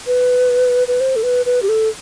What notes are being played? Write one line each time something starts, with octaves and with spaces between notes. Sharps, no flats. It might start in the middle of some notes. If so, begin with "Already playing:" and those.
B4
B4
C5
A4
B4
B4
G4
A4